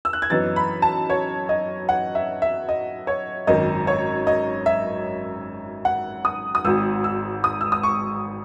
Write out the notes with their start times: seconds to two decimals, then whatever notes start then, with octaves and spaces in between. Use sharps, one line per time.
0.05 E6
0.13 F#6
0.22 G#6
0.30 F#2 E3 B3 D#4 A6
0.56 B5
0.82 A5
1.10 C#5
1.49 D#5
1.89 F#5
2.15 E5
2.42 E5
2.69 D#5
3.07 C#5
3.47 G#1 F#2 D#3 D#5
3.87 C#5
4.27 D#5
4.66 E5
5.85 F#5
6.25 D#6
6.55 D#6
6.65 G#1 G#2 F#3 E6
7.04 E6
7.44 D#6
7.61 E6
7.72 D#6
7.83 C#6